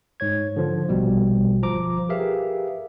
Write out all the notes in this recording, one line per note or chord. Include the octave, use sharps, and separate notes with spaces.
G#2 C#5 G#6
D3 F3
A#1 B2 G3
G1 F3 A#5 D6
G4 G#4 A#4 B4 E5 F5